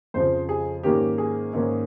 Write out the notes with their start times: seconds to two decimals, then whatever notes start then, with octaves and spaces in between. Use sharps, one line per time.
0.14 F2 C#3 F3 C5
0.49 G#4
0.83 G#2 D#3 A#3 C#4 G4
1.18 G#4
1.53 G#2 D#3 A#3 C#4